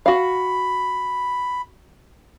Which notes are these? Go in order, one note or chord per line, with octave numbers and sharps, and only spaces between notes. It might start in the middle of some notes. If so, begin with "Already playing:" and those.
F#4 F5 B5